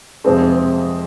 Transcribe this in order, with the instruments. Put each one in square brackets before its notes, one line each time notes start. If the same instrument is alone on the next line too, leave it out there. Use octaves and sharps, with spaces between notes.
[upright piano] F2 C3 F3 G#3 C4